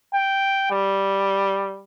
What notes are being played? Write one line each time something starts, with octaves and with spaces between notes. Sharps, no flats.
G5
G3